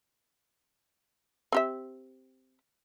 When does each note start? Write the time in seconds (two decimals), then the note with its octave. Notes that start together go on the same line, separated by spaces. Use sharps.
1.52 C4 G4 E5